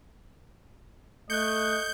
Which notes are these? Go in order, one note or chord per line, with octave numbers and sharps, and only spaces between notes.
A3 D#5 F#6 G6 C#7